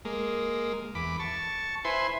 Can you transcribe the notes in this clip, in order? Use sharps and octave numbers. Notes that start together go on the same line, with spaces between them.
G#3 A#3
E2 B5 D6
A5 C#6
E4 B4 C5 G#5 C6